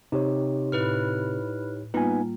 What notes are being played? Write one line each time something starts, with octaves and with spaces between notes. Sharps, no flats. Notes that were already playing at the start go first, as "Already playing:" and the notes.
C3 D#4 G4 C#5
A2 E4 B4 F6
G3 A#3 B3 D#4 F4 G#5